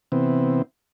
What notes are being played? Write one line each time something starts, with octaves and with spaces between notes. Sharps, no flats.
C3 E3 B3 C4